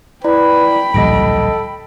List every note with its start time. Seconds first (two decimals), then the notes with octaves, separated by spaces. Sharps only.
0.24 E4 B4 D5 G5 A#5 B5
0.94 D1 A#1 G3 A4 D#5 A#6 D7